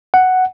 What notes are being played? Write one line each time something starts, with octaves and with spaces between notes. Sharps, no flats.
F#5